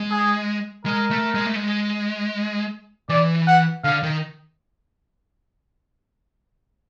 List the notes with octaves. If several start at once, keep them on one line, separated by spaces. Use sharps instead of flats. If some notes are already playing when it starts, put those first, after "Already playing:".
Already playing: G#3
G#4
G#3 A#4
A3
G#3
A3
G#3
E3 D5
F#5
D3 F5
D#3